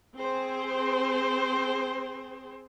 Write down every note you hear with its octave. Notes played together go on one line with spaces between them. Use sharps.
C4 G#4 C5